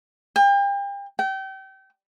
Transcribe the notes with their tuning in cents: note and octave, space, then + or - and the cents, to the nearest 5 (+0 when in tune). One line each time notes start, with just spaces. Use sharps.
G5 +35
G5 -30